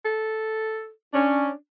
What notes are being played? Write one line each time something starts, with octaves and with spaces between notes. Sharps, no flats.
A4
C#4 D4